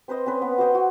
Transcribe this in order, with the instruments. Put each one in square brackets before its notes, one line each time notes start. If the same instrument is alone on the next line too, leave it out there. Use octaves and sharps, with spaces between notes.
[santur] C4 B4 C5 D#5
C4 C#4 B4
B3
F#4 C5 D#5 G5
F#4